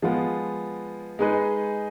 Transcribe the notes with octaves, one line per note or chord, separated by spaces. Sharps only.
F3 G#3 B3 F4
G#3 D#4 G#4 B4 D#5